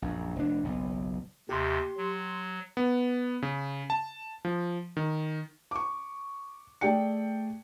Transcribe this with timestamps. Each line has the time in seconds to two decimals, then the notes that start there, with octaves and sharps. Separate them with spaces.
0.02 A#1 F#2
0.36 F1 D4
0.64 F#1 B1
1.49 D#2 C3 G4 C6
1.97 F#3
2.77 B3
3.42 C#3
3.90 A5
4.45 F3
4.97 D#3
5.71 C#6 D6
6.81 A3 G#4 D5 G5 C#7